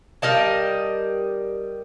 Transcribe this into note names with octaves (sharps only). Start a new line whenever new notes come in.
G3 A#4 D#5 A5